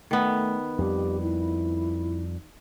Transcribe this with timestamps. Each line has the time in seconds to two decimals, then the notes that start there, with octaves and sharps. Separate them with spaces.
0.11 D#3 A3 B3
0.79 F2 G3 G4
1.22 E4